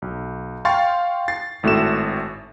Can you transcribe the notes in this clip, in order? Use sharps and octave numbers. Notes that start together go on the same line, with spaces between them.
B1
F5 G5 C6 C#6 A6
A6 C7
G#1 A2 A3 F#4 E7